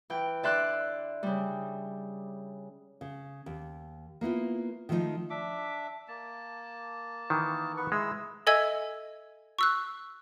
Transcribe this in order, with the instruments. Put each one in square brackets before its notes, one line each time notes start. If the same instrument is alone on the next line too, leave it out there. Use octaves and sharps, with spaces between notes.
[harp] E3 G5
D3 D5 E5 C6 F#6
C#3 G3
[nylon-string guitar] C#3
D#2
A#3 B3 E4 F4
D#3 F3 A3 C#4 D#4
[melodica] D4 E5 D6
A#3 A5
[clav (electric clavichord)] D#3 E3
[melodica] B3 B4 C#6
[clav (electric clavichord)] G#3 [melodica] E4 E6
[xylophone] A4 D#5 E5 G#5 E6 G#6
C#6 E6 F#6